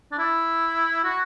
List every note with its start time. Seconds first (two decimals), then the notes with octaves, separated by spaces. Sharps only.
0.12 D4
0.19 E4
1.04 F#4